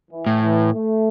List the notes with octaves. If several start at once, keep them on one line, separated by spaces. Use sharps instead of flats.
E3
A2
E3
A3